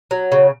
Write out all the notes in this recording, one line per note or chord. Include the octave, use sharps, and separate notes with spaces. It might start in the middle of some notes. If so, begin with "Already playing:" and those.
F#3
C#3